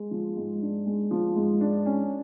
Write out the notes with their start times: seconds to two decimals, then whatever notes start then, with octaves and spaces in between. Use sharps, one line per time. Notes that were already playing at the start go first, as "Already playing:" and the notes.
Already playing: G#3
0.11 F3
0.36 G#2
0.62 D4
0.86 G#3
1.11 F3
1.36 G#2
1.61 D4
1.86 C#4